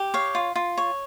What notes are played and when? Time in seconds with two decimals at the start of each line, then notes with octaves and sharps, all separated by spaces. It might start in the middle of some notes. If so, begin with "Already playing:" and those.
Already playing: G4
0.14 C#5 F5
0.35 F4
0.55 F4
0.78 C#5